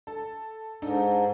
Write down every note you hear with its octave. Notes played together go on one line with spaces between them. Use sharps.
A4
G#2 D4 D#4 A4